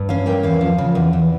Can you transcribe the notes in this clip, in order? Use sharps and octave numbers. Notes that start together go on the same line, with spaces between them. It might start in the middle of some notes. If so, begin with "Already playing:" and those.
Already playing: G2
C#4 F5
A#3 G5
E2 F5
F3
C#3
E2
E2